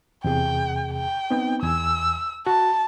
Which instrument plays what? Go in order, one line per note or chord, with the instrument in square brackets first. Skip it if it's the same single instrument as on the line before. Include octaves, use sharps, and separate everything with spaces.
[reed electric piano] E2 C3 G#4 [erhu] G5
[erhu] G5
[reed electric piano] B3 C4 D#4
[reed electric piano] E2 G#5 [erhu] E6
[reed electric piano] F#4 [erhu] A5